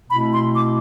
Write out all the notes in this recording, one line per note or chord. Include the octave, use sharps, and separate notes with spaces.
B2 A3 C4 E4 B5
C6
D6